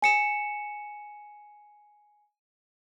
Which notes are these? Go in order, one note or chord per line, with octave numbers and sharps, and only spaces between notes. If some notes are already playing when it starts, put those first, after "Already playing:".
G#5 C#7 E7